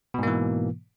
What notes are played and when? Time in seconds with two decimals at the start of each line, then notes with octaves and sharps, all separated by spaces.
0.14 B2
0.19 G#2
0.23 A#3
0.27 E3